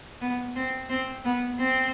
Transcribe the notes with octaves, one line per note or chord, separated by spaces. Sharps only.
B3
C4
C4
B3
C4